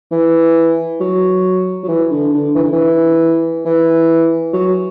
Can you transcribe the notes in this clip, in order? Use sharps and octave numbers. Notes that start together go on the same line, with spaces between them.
E3
F#3
F#3
E3
D3
D3
E3
D3
E3
E3
F#3